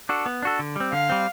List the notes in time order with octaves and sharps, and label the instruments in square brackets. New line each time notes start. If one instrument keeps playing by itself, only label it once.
[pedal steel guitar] D4 F#4 A4
B3
D4 F#4 A4
D3
G3 C4
[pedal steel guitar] D3 [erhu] F5
[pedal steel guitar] G3 C4